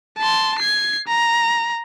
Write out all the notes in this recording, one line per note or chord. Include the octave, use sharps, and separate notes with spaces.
A5 C6
G#6 C7
A#5